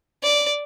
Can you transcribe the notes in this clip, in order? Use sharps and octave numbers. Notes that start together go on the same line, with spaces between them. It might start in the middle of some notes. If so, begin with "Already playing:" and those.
D5